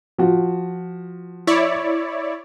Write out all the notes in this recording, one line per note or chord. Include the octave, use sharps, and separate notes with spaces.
F3 F#4
E4 C#5 D5